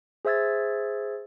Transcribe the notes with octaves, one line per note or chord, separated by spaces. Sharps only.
G#4 C5 E5 E6 G#6 A6